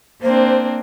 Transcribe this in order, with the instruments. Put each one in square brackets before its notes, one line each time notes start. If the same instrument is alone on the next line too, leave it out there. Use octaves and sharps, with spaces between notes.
[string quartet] A#3 C4 D4 [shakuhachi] C5